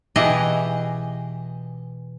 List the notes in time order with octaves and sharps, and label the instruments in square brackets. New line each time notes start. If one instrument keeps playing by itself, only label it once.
[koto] B2 E3 G4 G#4 D#5